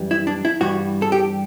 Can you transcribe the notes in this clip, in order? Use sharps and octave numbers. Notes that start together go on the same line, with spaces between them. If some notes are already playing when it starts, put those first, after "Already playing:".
Already playing: F#2 E3 G3
E4
D4
E4
G2 E3 G3 F#4
A4
G4